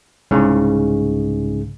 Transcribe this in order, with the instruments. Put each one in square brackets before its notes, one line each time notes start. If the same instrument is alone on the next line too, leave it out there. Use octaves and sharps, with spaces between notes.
[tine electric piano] C2 G#2 C#3